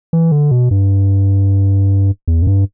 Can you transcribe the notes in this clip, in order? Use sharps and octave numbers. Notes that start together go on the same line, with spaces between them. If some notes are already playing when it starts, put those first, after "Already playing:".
E3
D3
B2
G2
E2
F#2
G2